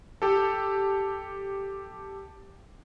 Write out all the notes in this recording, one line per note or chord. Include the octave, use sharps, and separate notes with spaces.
G4 A4